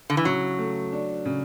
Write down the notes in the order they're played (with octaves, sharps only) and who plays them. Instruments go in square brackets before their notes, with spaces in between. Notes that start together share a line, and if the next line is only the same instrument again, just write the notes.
[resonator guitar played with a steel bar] D3
E3
[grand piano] C#3 [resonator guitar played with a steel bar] F#3
[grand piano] A3
D4
C#3